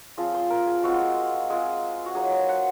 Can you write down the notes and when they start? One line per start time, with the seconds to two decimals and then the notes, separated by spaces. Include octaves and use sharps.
0.17 F3 C4 F4 G#4
0.34 C5
0.50 A#4
0.66 G#4
0.83 G#3 C4 F4 F#4
1.50 G#3 C4 F4 G#4
2.06 F#4
2.15 F#3 A#3 D#4 G#4
2.32 C5
2.49 F#5